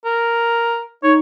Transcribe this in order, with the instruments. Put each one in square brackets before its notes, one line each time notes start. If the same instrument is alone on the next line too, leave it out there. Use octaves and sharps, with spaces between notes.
[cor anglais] A#4
[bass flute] D#4 [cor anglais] C#5